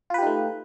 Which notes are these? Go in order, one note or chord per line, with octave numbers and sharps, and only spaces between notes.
A3 D#4 F4 G4 B4